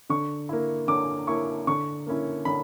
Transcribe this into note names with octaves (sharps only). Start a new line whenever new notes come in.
D3 C#6
A#3 E4
D3 D6
A#3 E4 C#6
D3 C#6
A#3 C#4 E4
D3 B5